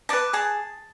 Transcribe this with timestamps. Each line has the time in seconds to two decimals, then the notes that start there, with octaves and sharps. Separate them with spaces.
0.09 B4 D5 A5
0.33 G#4 A5